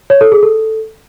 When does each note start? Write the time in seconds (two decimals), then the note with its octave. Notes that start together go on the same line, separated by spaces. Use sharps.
0.10 C#5
0.21 A4
0.32 G#4
0.43 A4